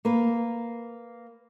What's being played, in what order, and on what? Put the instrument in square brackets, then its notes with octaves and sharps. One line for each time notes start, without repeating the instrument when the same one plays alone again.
[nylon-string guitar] A#3 A#4 B4